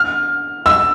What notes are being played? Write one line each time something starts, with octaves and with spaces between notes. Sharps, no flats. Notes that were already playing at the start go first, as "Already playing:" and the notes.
Already playing: F6
E6